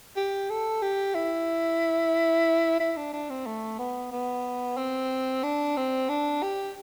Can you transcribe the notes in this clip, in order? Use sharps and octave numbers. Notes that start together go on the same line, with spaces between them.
G4
A4
G4
E4
E4
D4
D4
C4
A3
B3
B3
C4
D4
C4
D4
G4